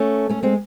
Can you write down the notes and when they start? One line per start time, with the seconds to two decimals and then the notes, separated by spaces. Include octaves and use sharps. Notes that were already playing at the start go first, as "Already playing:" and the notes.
Already playing: A3 C#4
0.29 A3 C#4
0.43 G#3 C4